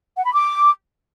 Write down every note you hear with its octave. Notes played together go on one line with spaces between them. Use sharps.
F#5
B5
D6